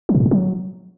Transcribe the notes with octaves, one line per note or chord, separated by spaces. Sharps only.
F3
A#2
G#2
A#2
F#3